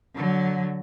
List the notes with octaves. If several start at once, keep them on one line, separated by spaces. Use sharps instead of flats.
D3 F#3